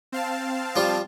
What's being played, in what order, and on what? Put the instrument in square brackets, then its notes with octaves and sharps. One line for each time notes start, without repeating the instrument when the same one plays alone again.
[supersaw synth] C4 F5 A5
[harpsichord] F3 G3 F4